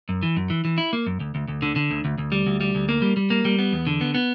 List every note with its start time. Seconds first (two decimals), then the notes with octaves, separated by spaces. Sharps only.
0.09 F#2
0.23 E3
0.37 F#2
0.50 E3
0.65 E3
0.78 E4
0.93 A#3
1.07 F#2
1.20 D2
1.35 D2
1.48 D2
1.62 D3
1.76 D3
1.91 D2
2.05 D2
2.18 D2
2.32 G3
2.47 D2
2.61 G3
2.75 D2
2.89 A#3
3.02 G3
3.17 G3
3.30 A#3
3.45 G3
3.59 B3
3.73 E2
3.87 D3
4.01 B3
4.15 B3